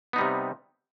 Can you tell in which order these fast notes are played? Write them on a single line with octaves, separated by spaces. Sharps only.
B3 D#4 G3 C3